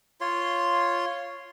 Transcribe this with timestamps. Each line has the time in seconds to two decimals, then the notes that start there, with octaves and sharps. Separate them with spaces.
0.21 F4 C#5 C6